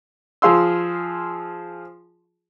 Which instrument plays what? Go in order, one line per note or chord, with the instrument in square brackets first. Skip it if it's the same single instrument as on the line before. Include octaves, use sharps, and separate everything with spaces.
[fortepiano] F3 G#4 F5 C6 E6